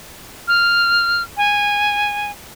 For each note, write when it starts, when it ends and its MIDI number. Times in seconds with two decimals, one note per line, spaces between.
0.48 1.22 89
1.37 2.31 80